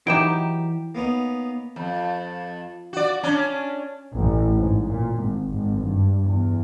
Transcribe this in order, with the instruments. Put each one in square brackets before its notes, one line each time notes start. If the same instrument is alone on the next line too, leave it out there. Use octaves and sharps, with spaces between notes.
[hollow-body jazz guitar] E3 [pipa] F#3 D#4 G4 [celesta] D7 E7
[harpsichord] A#3 B3 C#4 D#4
[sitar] F2
F#4 D5
C#4 D4
[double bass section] A1
G#2
A#2
G#1
G#1
G2
E2